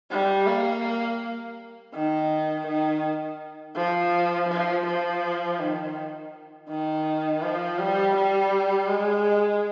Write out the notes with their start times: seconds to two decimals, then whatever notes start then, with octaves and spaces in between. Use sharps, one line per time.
0.11 G3
0.47 A#3
1.94 D#3
2.67 D#3
3.76 F3
4.49 F3
4.86 F3
5.59 D#3
6.69 D#3
7.42 F3
7.79 G3
8.16 G3
8.89 G#3